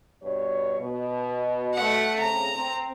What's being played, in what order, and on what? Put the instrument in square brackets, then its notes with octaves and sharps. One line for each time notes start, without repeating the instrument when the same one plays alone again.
[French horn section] G2 B2 C#5
B2
[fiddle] A3 F#5
[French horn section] C#3 C4 [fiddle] A#5
[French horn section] C4